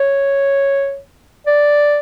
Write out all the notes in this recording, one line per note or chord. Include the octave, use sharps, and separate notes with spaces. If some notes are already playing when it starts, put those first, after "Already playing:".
Already playing: C#5
D5